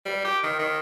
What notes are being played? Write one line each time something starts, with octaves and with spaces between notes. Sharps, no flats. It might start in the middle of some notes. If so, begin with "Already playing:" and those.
G3
G4
D#3
D#3